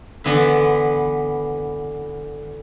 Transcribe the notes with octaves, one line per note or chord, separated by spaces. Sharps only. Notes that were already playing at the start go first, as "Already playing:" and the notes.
D3 E3 B3 E4 B4